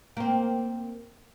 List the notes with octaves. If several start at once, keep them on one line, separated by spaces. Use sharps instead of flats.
A#3 C4